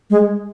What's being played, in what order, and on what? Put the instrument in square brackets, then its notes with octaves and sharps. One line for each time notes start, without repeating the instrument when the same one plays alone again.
[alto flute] G#3